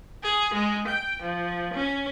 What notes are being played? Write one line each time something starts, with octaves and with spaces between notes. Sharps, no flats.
G#4
G#3
G5
F3
C#4